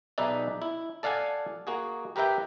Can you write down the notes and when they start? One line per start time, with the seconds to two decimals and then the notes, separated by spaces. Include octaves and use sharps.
0.18 B1 D#4 G#4 B4 D5 E5
0.62 E4
1.03 A4 D5 F5 F#5 G#5 A5
1.67 A#3 F#4 G#4
2.16 G4 A#4 B4 E5 G5